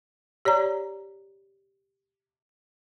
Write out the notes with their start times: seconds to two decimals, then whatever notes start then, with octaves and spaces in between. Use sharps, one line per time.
0.45 G4 C#5 D5 A#5